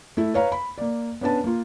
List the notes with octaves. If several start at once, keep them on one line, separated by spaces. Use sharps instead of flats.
A3 E4
B4 C#5 F5 A#5
B5
A#3 D5
B3 C#4 D4 B4 A5
A#3 F4